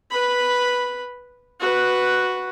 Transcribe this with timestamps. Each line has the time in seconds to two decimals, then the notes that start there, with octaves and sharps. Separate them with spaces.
0.10 B4 B5
1.60 F#4 B4